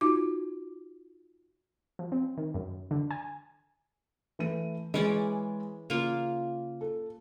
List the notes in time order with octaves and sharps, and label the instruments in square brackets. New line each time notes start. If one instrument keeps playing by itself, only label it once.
[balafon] D#4 F4 F#4 D6
[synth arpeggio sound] F3
C4
D#3
F#2
D3
G#5
[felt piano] E3 A3 D#7
[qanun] E3 C#4 D5 [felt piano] G#3 G#4
[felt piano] C#3 [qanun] A#3 F4
[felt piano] A4